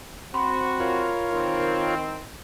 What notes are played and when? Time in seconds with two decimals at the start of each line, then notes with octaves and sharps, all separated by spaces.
0.34 C4 F#4 B5 C6
0.80 F4 A#4 C#5
1.31 D#3 C4